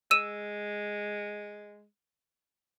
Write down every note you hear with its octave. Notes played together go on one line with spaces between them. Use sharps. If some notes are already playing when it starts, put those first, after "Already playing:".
G#3 E6 D#7 E7